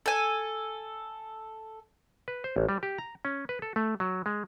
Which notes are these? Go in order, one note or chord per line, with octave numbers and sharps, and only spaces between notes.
A4 G#5
B4
C5
A1
G3
G4
A#5
C#4
B4
A4
A3
F#3
G#3